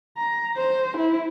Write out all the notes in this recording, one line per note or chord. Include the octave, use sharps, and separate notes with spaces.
A#5
C5
E4